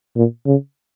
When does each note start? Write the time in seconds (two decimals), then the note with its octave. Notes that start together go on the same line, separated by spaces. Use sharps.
0.16 A#2
0.46 C#3